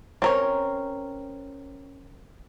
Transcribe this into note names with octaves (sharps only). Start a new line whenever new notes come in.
C4 C#4 A#4 C#5